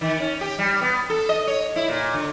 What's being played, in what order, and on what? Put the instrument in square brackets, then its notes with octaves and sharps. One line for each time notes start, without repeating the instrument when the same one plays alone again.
[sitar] D#3
C#4
G4
G3
B3
A4
D#5
C#5
E4
A#2
D3